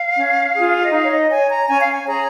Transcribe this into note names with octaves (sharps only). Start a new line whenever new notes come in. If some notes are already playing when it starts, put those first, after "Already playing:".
Already playing: F5
C#4
F4 G#4
D#5
D#4 F5
C#5
D#5
C#5 G#5
A#5
C#4 G#5
F5
G#5
G#4 C#5 A#5